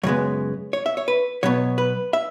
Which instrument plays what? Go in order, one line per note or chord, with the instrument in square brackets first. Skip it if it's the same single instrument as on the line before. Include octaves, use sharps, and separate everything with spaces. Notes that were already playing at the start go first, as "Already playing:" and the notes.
[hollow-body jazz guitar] F#2 C#3 G#3 B3 C#5
C#5
E5
C#5
B4
B2 F#3 B3 C#5
B4
E5